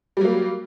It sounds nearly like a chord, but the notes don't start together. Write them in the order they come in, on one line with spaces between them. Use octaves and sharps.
G3 F#3 A#3